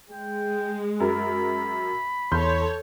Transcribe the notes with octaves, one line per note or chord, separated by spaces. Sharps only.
G#3 G5
F#2 A#4 B5
E2 A4 C#5 C6 G6